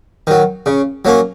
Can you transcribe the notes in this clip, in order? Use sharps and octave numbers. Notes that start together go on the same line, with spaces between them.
D#3 F#3
C#3
F#3 A#3 C#4